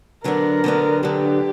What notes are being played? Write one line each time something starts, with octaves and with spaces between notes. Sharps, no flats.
D3 F#3 B3 D4 A#4
D3 F#3 B3 D4
D3 F#3 B3 D4 G4